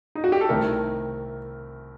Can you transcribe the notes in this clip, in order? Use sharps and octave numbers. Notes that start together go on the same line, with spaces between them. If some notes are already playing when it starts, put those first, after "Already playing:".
D#4
F#4
G4
A4
C2 C3 D#3 A3 A#4